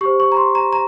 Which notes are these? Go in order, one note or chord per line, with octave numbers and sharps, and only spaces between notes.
G4 C5 C#6
C#6
A#5
C6
A#5
A#5